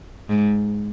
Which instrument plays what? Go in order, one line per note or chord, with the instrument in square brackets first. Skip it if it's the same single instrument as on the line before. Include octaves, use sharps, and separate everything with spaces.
[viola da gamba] G#2